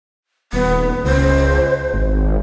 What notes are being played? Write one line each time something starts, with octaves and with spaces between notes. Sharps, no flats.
D#1 B3
C#2 C5
G#1